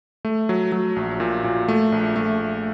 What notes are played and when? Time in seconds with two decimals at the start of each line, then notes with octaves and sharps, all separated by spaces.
0.25 A3
0.49 F#3
0.72 F#3
0.96 A#1
1.20 A#2
1.44 A#2
1.68 A3
1.92 A#1
2.16 A3